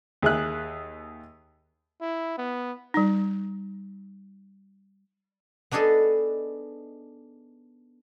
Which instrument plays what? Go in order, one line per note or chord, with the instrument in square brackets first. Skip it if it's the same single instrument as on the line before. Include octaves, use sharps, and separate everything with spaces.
[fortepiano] D#2 G#4 E5 F#6
[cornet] E4
B3
[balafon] G3 D#4
[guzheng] B3 D4 D#4 G#4 A4